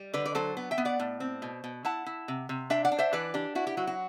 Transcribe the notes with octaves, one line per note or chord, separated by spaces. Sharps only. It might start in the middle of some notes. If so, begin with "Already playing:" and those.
Already playing: G3
D3 B4 D5
D5
F#3 A4 C5
B3
E5 G5
B3
D5 F#5
A2
C4
B2
B2
E4 F#5 A5
E4
C3
C3
D4 E5 G5
D5 F#5
D4
C5 E5
E3 B4 D5
D4 G4
E4 F#4
G4
F#3 F#4
F#4